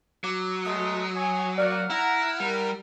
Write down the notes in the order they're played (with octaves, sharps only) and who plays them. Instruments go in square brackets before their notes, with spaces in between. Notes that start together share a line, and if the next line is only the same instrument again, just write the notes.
[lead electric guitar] F#3 [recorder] D6
[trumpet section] G#3 A3 D#5 [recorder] D#6
[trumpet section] C#5 G#5 [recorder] D#6
[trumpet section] A#3 F#4 [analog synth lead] D5 [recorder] F6
[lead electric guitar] E4 [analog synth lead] F#5 [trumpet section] A#5
[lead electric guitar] G3 [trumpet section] E4 A#4